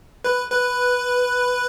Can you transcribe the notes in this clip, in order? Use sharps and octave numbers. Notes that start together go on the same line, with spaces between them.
B4
B4